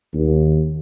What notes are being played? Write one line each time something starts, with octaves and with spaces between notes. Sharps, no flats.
D#2